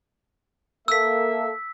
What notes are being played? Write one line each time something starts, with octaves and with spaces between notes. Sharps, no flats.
A#3 A4 E5 E6 B6